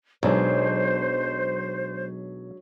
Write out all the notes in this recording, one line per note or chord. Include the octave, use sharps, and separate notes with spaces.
B1 F#3 G#3 D4 C5